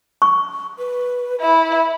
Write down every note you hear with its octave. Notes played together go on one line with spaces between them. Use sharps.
C#6
B4
E4 B5